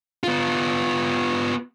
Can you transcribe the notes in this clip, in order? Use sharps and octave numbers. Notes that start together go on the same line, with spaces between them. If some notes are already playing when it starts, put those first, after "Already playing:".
B3 F4